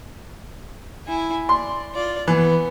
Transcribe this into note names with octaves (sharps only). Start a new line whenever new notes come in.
E4 G#5
D5 C6
F4 D5
E3 B3